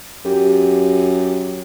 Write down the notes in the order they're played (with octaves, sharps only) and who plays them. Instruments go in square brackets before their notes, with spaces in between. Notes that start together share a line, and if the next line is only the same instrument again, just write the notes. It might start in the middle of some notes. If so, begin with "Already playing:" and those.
[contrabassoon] F#2 [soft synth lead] G4